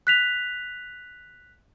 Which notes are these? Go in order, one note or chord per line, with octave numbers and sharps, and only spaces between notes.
F#6 B6 F7